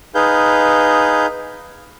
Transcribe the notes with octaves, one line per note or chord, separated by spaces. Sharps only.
D#4 G#4 B4 F5 G6